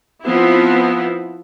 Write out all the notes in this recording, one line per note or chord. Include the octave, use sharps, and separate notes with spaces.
F3 B3 C4 E4